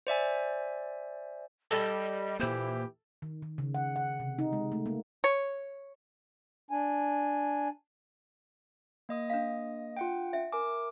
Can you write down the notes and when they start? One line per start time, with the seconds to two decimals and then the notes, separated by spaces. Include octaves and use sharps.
0.07 C5 D5 E5 G#5
1.71 G3 A4 D#5
2.39 A#2 E3 A#3 E4 G4 C5
3.22 D#3
3.42 D#3
3.58 C#3
3.75 F#5
3.96 F#5
4.20 C3
4.39 D#4
4.53 G#3
4.72 A3
4.86 A#3
5.24 C#5
6.71 D4 G#5
9.09 A#3 D#5 D#6
9.30 D4 F5
9.97 F4 F#5 G5
10.33 E5
10.52 A#4 G#5 D6